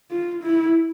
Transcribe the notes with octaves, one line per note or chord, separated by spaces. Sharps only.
F4
E4